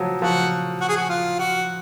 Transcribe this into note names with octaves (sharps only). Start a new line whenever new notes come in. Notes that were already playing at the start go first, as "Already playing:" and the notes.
Already playing: F3 F#3
F3 F#4
F#4
G#4
F#4
F4
F#4